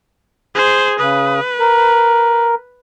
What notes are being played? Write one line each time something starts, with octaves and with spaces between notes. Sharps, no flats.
G#4 C5
C#3 B4 D#6
A#4